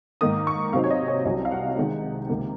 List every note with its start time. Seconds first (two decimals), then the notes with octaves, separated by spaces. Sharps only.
0.21 G#2 D#3 A#3 D#4 D#6
0.47 C#6
0.73 C3 F#3 C4 D#4 F5
0.84 C#5
0.90 D#5
1.08 C#5
1.25 C2 C3 F#3 C#4 D#5
1.45 F5
1.51 F#5
1.77 C3 D#3 G#3 D#4
2.29 C#2 C3 D#3 A#3